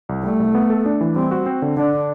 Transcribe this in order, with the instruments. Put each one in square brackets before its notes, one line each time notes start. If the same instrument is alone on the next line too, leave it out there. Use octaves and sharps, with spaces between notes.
[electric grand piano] C2
[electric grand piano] G3 [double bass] A3
[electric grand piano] C2
B3
A4
D4
E3
[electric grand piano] G3 [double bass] C4
[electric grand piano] F#4
C4
D3
[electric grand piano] D3 [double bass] D4